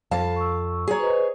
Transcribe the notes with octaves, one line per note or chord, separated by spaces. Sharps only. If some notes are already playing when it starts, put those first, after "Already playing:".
F2 F5 A5
C#6 E6
F#4 G#4 C#5 A#5
B4 C5 D#5